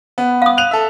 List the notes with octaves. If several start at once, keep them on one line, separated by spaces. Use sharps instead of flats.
B3
F5 D#6
F#6 D#7 F7
A4 E5